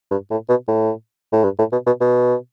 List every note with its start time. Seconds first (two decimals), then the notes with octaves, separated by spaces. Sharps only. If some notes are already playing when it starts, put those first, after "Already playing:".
0.11 G2
0.31 A2
0.49 B2
0.68 A2
1.32 A2
1.44 G2
1.58 A2
1.72 B2
1.86 B2
2.01 B2